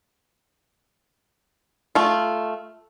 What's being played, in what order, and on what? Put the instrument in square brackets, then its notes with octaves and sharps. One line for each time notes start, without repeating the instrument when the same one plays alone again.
[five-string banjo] A3 F4